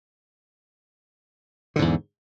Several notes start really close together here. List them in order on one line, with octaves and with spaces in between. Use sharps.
D3 G#2 E2